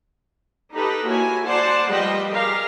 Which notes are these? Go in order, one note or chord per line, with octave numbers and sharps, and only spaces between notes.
D#4 G4 A4 B4 D#5
A#3 E4 F#4 C#5 G#5
C5 D5 F#5 A5
F3 G3 B4 D#5 G5
G4 G#4 A#4 F5